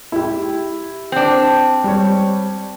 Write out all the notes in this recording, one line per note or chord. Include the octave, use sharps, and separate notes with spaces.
E4 G4
C4 D4
G3 C#5